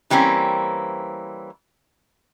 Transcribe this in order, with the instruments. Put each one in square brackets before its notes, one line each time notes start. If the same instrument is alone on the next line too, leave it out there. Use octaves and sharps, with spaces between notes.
[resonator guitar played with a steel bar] E3 G3 A#3 C4 C#4